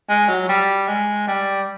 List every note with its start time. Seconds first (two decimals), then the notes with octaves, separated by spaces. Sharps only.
0.09 G#3
0.29 F#3
0.49 G3
0.88 G#3
1.27 G3